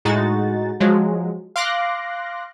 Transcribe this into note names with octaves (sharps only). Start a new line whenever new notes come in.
A2 G#3 D#4 F#4 A6
F3 F#3 G#3
F5 C6 D6 F#6 A#6